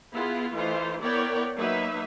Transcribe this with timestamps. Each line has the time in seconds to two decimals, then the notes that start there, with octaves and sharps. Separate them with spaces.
0.12 B3 E4 F4 G#4
0.53 E3 A3 D#4 F4 C5
1.01 B3 E4 A#4 C#5 D5 G5
1.57 F#3 A#3 D#4 B4 E5